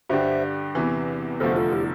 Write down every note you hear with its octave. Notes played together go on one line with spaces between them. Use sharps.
G2 D3 G3 D4 G4 C5 E5
E2 C3 E3
F1 E2 D3 F3 A3 A4 C5
F4 A4
E4 G4